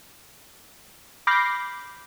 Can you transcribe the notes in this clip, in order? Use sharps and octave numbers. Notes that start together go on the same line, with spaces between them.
B5 D6 F6 G6 A#6 C7